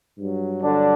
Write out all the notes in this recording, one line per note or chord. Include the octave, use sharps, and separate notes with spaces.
G2 F#3
D3 D4